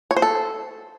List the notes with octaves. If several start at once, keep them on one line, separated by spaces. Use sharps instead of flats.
C#5
C5
A4